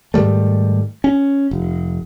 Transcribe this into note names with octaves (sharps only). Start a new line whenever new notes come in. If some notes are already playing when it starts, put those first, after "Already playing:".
G#2 D#3 G3 A3
C#4
F1